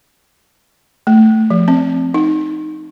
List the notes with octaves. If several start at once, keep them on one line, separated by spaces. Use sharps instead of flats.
A3
F3
C4
D#4